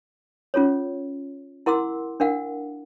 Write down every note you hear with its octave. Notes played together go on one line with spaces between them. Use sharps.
C#4 F4 A4 C#5
E4 A#4 F#5 C6 D6 E6
D4 A#4 F5 F#5